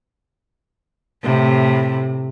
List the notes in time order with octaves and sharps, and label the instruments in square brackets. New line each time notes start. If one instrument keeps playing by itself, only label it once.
[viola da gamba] A2 C3